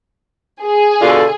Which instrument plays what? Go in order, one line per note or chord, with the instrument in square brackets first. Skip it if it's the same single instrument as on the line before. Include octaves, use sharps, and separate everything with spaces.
[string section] G#4
[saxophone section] B2 D3 F4 [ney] A4